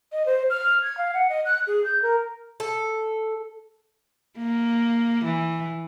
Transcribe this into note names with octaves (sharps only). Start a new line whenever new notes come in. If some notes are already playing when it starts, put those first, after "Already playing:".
D#5
C5
F6
G#6
F5
F#5
D#5
F#6
G#4
G6
A#4
A4
A#3
E3